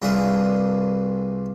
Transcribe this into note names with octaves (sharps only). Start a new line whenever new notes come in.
C2 E3 D4 F4 G#4